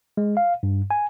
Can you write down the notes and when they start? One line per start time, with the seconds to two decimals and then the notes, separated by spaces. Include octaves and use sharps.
0.17 G#3
0.37 F5
0.63 G2
0.91 G#5